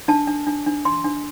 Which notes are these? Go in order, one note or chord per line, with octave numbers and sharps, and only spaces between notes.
D4 A5
D4
D4
D4
D4 C6
D4